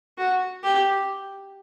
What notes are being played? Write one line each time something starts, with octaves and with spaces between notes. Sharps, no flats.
F#4
G4